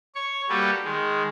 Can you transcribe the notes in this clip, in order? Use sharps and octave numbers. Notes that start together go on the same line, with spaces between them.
C#5 C#6
G3 A#3 F#4 G4 A4 B4
D#3 G#3